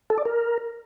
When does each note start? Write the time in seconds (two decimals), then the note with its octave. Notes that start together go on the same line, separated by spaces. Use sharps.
0.10 A4
0.18 D5
0.25 A#4